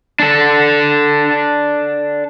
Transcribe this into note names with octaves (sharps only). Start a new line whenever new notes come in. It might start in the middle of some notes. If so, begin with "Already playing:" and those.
D4 A4